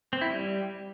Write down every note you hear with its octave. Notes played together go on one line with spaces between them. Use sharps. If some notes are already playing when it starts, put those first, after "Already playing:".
C4
E4
G3